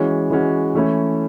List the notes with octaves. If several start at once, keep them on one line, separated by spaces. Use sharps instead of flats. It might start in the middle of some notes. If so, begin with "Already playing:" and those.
Already playing: E3 G#3 C#4 F#4
E3 G#3 C#4 F#4
E3 A3 C#4 E4